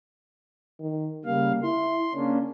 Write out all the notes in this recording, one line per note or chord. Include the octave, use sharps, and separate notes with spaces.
D#3
C#3 G3 A#3 F5
E4 C6
C#3 A#3 C#4 D4